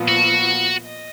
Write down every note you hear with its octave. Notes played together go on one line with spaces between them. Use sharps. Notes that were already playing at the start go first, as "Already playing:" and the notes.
Already playing: A#2 F3 B3
F#4
D#5